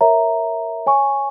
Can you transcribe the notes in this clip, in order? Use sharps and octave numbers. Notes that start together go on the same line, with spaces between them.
A#4 C#5 E5 A#5
C#5 G#5 C#6